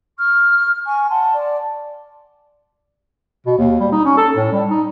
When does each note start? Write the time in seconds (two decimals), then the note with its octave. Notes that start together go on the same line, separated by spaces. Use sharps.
0.17 C#6 F6
0.85 G#5 C#6
1.10 F#5 A5 C6
1.34 D5
3.47 B2
3.58 D#2
3.80 G3
3.92 D#4
4.05 C#4
4.17 A4
4.36 A2
4.52 G3
4.70 D#4